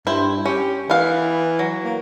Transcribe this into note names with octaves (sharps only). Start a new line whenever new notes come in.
G2 E4 C5
C#4 G4
E3 B3 F5
F#3
A#3